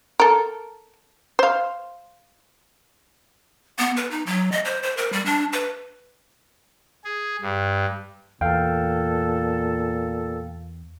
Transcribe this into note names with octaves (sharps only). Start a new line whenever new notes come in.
A4 A#4
C5 F5
B3
B4
D#4
F#3
D#5
C5
C5
A#4
G3
D4
B4
G#4
G2
E2 A#2 A4 F5 G5